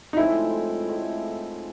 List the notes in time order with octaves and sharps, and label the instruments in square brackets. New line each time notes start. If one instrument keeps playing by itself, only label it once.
[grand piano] D#4
[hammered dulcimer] A2 F3 G#3 C4 [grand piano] E4
[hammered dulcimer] A2 F3 G#3 C4